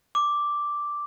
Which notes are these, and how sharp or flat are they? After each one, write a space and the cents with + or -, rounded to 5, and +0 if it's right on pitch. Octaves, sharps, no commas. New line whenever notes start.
D6 -5